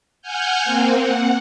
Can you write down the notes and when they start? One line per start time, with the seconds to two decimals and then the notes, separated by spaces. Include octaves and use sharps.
0.22 F#5 G#5 F6 G6
0.64 A#3 C4
0.99 F#5